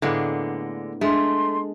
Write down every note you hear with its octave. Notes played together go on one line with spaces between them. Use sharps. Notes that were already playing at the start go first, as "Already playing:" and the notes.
A2 D3 G#3 A#3 B3
G#3 A3 D4 C6